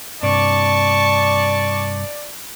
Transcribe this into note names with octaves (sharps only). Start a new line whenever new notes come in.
G2 C3 D5 A5 C#6